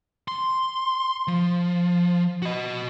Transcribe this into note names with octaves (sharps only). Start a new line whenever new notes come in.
C6
F3
F#4 D#5